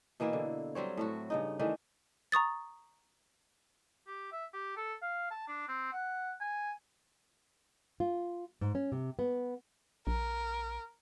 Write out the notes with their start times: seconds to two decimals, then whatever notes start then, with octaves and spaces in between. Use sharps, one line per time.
0.20 B2 E3 A#3 E4
0.33 D3
0.75 F#3 G3 C4 C#5
0.97 A2 A3 F#4
1.30 G2 C#3 D#4
1.59 D#3 E3 A3 D4
2.32 A#5 C#6 D#6 A6
4.07 G4
4.32 E5
4.53 G4
4.77 A4
5.02 F5
5.30 A5
5.48 D4
5.68 C4
5.92 F#5
6.41 G#5
8.00 F4
8.61 G#2
8.75 C#4
8.92 C3
9.19 B3
10.07 A#1 A#4